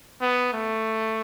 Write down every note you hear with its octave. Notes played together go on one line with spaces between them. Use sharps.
B3
A3